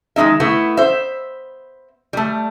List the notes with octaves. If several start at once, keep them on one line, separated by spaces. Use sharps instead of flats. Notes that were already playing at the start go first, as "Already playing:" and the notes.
D#3 G#3 A#3 D#4 E5
A3 B3 E4
C5 E5
G3 A3